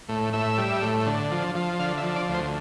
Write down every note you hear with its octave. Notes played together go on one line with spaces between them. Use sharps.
A2
A2 E5
G3
A2
D3
F3
F3
D3 F5
E5
F3
D5
D2
C5